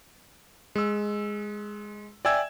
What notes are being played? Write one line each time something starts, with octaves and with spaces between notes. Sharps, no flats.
G#3 E6
D5 E5 G5 G#5 E6 G#6